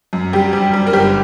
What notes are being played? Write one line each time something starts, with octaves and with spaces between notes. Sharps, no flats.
F#2
G3 G4
G3
G3
A#4
G1 G4